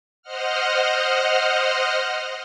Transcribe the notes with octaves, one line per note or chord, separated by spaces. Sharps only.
C5 D#5 F#5 F6